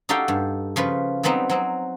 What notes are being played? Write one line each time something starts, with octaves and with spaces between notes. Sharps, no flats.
D#4 F#4 G4 A4 F5 G5
G2
C#3 F3 F4 B4
F#3 G3 B3 C4 D#4
F#3 C4 D#4